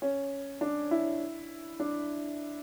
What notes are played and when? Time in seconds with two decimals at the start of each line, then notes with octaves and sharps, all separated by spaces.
0.02 C#4
0.61 D4
0.91 E4
1.80 D4